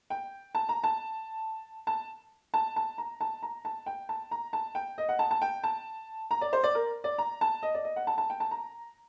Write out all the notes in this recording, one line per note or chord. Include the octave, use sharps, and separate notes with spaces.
G5
A5
A#5
A5
A5
A5
A5
A#5
A5
A#5
A5
G5
A5
A#5
A5
G5
D#5
F#5
A5
A5
G5
A5
A#5
D5
C5
D5
A#4
D5
A#5
A5
D#5
D5
D#5
F#5
A5
A5
G5
A5
A#5